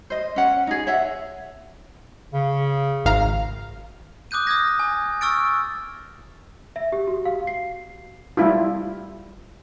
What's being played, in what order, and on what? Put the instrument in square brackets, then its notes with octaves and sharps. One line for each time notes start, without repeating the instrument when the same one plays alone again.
[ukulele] C5 D#5
C#4 F#5
D#4 G#4
C#5 E5 F#5
[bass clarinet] C#3
[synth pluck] G#1 F5 A#5
[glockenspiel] D6 D#6 F#6 G6 D#7
D#6 F6 G6 G#6 A#6
G#5
C#6 E6 F6 A6 D7
[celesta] E5
G4
F#4
F5
C7
[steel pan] G3 E4 F4